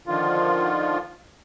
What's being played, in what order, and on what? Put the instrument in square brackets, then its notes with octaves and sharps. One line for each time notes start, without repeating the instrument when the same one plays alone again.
[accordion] D3 D#3 F3 F4